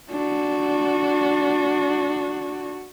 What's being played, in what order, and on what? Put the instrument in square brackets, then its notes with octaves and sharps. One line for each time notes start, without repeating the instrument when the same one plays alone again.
[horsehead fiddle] D4 F#4